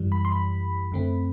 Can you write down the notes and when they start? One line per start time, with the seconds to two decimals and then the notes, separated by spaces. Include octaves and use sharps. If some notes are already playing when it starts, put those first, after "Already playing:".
Already playing: F#2 E3 G3
0.12 B5
0.25 C6
0.32 B5
0.92 F#2 D3 A3 C4